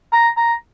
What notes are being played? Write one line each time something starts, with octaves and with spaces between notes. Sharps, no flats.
A#5
A#5